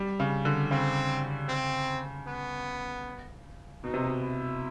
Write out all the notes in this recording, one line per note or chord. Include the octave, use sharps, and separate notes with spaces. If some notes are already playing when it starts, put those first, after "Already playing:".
Already playing: G3
C#3
D3
C#3 C4
C4
B3
B2 D#4
C3
B2
E4